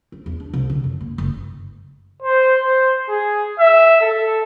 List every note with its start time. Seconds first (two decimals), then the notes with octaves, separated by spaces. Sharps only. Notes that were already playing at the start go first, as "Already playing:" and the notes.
0.12 C4
0.26 E2
0.40 D4
0.53 C2
0.70 D3
0.84 F#2
1.01 A#3
1.18 F#1
2.22 C5
2.61 C5
3.09 G#4
3.59 E5
4.01 A4